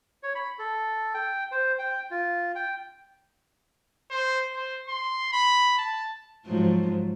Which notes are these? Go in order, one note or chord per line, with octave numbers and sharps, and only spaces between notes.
C#5
B5
A4
G5
C5
G5
F4
G5
C5
C5
C6
B5
A5
G#2 F3 F#3